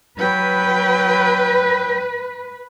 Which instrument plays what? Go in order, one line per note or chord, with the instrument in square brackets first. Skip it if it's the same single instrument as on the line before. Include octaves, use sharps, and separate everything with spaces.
[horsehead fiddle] F#3 G5 [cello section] B4